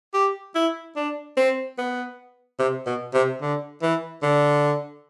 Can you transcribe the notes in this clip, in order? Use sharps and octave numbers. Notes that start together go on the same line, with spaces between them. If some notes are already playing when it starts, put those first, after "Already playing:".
G4
E4
D4
C4
B3
C3
B2
C3
D3
E3
D3